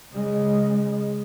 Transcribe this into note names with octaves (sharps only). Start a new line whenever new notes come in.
C#3 G#3